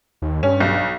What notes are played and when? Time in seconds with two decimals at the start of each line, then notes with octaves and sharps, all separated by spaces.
0.22 D#2
0.43 G2 C#4
0.60 B1